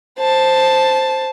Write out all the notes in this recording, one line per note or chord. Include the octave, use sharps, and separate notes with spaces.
C5 A5